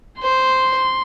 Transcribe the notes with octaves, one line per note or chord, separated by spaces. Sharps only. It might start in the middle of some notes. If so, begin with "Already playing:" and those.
C5 C6